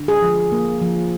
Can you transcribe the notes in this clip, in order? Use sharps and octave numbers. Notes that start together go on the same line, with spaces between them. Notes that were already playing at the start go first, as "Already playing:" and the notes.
Already playing: D3
G#4
F3
A#3
F3